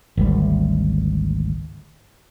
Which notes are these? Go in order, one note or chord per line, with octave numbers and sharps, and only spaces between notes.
G#1 D2 G3